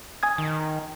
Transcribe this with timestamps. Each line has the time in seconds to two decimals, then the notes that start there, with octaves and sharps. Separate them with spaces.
0.23 G#5 D#6 G#6
0.38 D#3